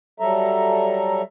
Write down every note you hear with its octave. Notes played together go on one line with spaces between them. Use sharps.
F#3 G3 A4 E5 A#5